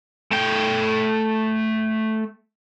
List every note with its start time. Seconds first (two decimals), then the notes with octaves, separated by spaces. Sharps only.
0.31 A3 G5